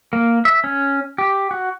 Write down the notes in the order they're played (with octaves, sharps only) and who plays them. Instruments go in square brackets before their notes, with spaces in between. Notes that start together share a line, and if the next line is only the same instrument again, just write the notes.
[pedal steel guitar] A#3
E5
C#4
G4
F#4